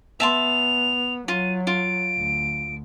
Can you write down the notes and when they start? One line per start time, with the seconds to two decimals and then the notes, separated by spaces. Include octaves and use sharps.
0.20 B3 E5 A5 C6 F7
1.28 F#3 F4 D#7
1.67 F4 D7
2.16 D2